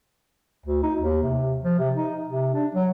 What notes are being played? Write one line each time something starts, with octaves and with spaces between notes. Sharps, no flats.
D2
D#4
D#2
C3
F3
C3
D#4
C3
D4
F#3